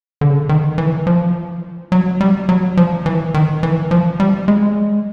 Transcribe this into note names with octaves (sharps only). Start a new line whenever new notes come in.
D3
C#3
D3
D#3
E3
F3
F#3
G3
F#3
F3
E3
D#3
E3
F3
G3
G#3